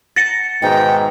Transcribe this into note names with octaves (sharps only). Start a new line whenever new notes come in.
F#5 A5 A#5 A6 A#6 C#7
G#2 B2 D#3 G5